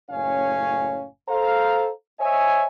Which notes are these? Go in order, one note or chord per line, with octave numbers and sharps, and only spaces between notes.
F#1 A2 C#4 C#5 F5 G#5
A4 C5 F5 A#5
C5 C#5 D#5 E5 G#5